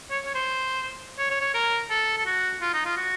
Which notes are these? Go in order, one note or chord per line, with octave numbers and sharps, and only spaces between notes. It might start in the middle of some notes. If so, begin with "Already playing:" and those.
C#5
C#5
C5
C#5
C#5
C#5
A#4
A4
A4
F#4
F4
D#4
F4
F#4